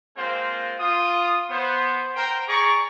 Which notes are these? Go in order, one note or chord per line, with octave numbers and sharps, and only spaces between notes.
G#3 A#3 C4 F4 A#4 C5
F4 D#6
B3 C5
A#4 C5 G5
G#4 D5 A#5 C#6